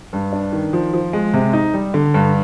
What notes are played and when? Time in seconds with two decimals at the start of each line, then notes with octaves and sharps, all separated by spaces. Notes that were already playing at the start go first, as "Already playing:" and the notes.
0.13 G2
0.33 D4
0.52 D#3
0.73 F3
0.93 F3
1.13 G#3
1.34 C3
1.53 D#4
1.74 G3
1.94 D3
2.14 G2